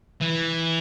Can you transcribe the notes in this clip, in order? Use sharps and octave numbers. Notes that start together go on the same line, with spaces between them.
E3